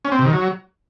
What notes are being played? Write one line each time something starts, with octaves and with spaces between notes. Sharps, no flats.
C#4
C4
C3
D#3
F#3